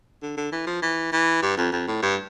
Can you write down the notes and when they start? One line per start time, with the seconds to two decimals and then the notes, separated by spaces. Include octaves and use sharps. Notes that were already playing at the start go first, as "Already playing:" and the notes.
0.22 D3
0.37 D3
0.52 E3
0.67 F3
0.82 E3
1.12 E3
1.42 G2
1.57 F2
1.72 F2
1.87 A2
2.02 G2